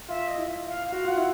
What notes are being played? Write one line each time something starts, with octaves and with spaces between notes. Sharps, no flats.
F4 E5
D#5
E4
E5
F5
F#4 F5
F4 F#5
E4